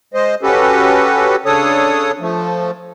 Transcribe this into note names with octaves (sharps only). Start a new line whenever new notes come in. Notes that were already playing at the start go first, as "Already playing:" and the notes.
G#3 C5 D#5
C#4 F#4 G4 A4 B4
C#3 D4 A4 C#5 D#6
F3 A3